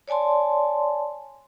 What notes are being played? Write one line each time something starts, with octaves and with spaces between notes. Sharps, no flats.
C#5 D5 G#5 A5 C6